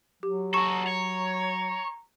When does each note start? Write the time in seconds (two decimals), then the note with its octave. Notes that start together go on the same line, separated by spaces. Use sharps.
0.23 F#3 G4
0.54 F#4 A4 A#5 C#6
0.87 C#5